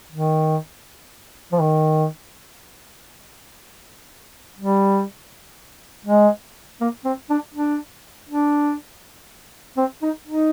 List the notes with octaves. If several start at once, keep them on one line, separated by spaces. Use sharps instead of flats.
D#3
F3
D#3
G3
G#3
A#3
C4
D4
D4
D4
C4
D#4
D#4